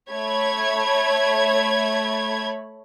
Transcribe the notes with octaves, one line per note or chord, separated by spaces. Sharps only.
A3 C#5 B5 G#6